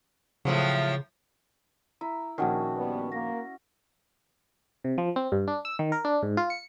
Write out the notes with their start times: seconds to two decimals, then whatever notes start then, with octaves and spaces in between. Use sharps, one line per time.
0.45 A2 C#3 F3 F#3
2.01 E4 A#5
2.38 A#1 D#3 C#4 F#4 F#5 G5 A5
2.77 G3 B3
3.12 A#3 A#6
4.84 C3
4.98 F3
5.16 C4
5.32 G2
5.48 D4
5.65 E6
5.79 D#3
5.92 A#4
6.05 D4
6.23 G#2
6.37 F4
6.50 C#7